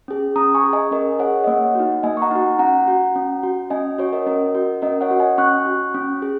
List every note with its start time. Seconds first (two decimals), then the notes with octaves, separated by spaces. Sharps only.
0.08 C#4 G#4
0.36 C#4 A#5 D#6
0.55 G#5 C#6
0.64 G#4
0.73 D#5 G#5
0.92 C#4 A#4 D#5
1.19 G#4 C#5 F#5
1.44 D#5
1.47 A#3 C#5 F#5
1.75 D#4 F#4
2.03 A#3 D#5 G#5
2.17 C#6
2.22 F#5 A#5
2.31 D#4 F#4
2.59 C#4 F#5 A#5
2.88 F#4
3.15 C#4
3.43 F#4
3.70 C#4 D#5 G#5
3.98 F#4 C#5
4.12 A#4 D#5
4.27 C#4 A#4 D#5
4.55 F#4
4.82 C#4 A#4 D#5
5.01 C#5 F#5
5.11 F#4
5.20 D#5 G#5
5.38 C#4 C#6 F#6
5.66 F#4
5.94 C#4
6.22 G#4